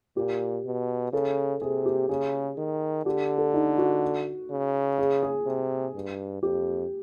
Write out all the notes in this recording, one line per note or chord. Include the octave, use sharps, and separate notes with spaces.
A#2 G4
B2
C#3 A4
C3 G#4
G4
C#3 G#4
D#3
D3 G4
A4
D#4
F#4
C#3
G#4
G#4
C3
G2
F2 G4